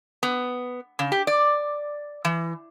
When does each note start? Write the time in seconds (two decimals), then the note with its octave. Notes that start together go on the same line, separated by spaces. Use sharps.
0.23 B3
0.99 C#3
1.12 G4
1.27 D5
2.25 E3